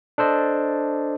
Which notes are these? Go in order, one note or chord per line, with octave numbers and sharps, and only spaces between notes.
D4 A4 C5 D#5